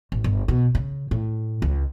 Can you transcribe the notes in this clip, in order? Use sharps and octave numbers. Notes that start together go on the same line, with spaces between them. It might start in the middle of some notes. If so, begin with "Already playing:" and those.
A1
G1
B2
C#3
A2
C#2